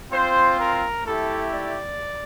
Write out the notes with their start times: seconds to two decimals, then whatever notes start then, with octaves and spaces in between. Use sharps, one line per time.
0.11 C4 F4 C5
0.58 A#4
1.05 A3 E4 G4 A4
1.52 D5